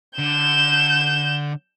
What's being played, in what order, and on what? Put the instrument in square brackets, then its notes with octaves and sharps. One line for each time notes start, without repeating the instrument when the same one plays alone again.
[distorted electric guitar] D3 [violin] G6 E7